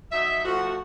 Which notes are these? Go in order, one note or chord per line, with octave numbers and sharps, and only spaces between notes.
F#3 D#4 E5
F3 A3 F#4